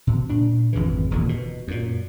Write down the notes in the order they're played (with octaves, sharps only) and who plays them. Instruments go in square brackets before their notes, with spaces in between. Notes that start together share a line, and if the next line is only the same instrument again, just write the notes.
[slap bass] B2
A#2 D4
G#1 F2 C#3 E3
E1 D#2 A#2 D3
B2
F#2 A#2